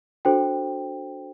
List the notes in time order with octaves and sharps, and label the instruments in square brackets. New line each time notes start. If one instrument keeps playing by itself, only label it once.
[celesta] D4 F#4 A4 C5 G5